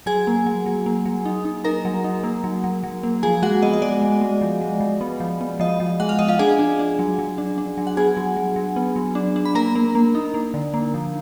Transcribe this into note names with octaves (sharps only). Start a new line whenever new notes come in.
F#3 G#4 G#5
A#3
F#3
F#3
A#3
F#3
D#4
D#4
D#4 A#4 A#5
F#3
D#4
A#3
F#3
F#3
F#3
A#3
F3 G#4 G#5
G#3 F#4 F#5
B3 D#5
D#5
G#3 D5
G#3
G#3
F3
G#3
F3
B3
F3
B3
F3 D#5
F3
G#3 F#5
F5
F3 D#5
F4 F5
D4 G#4 G#5
D4
D4
F#3
F#3
D4
D4
F#3
F#5
B3 G#4 G#5
F#3
F#3
F#3
B3
F#3
D4
D4
B5
A#3 A#4 A#5
A#3
A#3
D#4
A#3
D3
A#3
F3